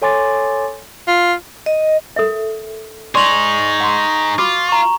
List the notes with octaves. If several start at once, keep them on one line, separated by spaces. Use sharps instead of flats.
A4 C#5 G#5 C6 D6 A6
F4
D#5
A4 A#4 E5
D#4 G#4 D5 C6 C#6 F7 F#7
F#5 C6
F4 F#4 B5 D6
A#5 C#6